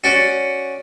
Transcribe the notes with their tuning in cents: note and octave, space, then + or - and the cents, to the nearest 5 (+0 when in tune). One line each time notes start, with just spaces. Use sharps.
C#4 +0 F#4 +0 D5 +0